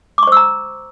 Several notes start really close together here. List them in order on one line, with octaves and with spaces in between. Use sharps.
D6 C#6 C5 E6 A#5